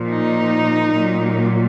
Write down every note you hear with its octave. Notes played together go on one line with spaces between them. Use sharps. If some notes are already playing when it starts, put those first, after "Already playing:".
Already playing: A#2 F3
D#4
A#2 F#3